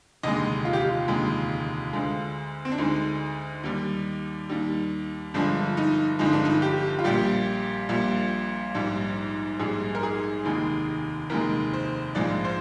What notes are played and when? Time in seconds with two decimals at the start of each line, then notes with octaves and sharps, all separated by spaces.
0.23 F1 D#2 D3 G#3 D#5
0.65 F4
0.73 G4
0.80 F4
1.08 F1 D#2 D3 G#3
1.93 D2 D3 G#3
2.65 C4
2.72 D4
2.78 D2 D3 G#3 D#4
3.64 D#2 D#3 G3
4.49 D#2 D#3 G3
5.34 G1 G2 F3 G#3 D4
5.77 D#4
6.19 G1 G2 F3 G#3 D#4
6.33 D4
6.45 D#4
6.62 G4
6.99 F4
7.04 A#1 A#2 G3 G4
7.89 A#1 A#2 G3
8.75 A#1 G#2 G3
9.59 A#1 G#2 G3 G#4
9.95 A#4
10.03 G#4
10.45 F1 D#2 D#3 G#3
11.30 F1 D#2 D#3 G#3 A#4
11.73 C5
12.15 A#1 G#2 F3 G#3 D5
12.44 C5